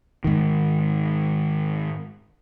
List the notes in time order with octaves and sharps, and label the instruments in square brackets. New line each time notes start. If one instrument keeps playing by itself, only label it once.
[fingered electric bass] G#2 D#3